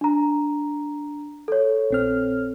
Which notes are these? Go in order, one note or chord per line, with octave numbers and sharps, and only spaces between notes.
D4 A#5
A4 C#5
A#1 C4 F6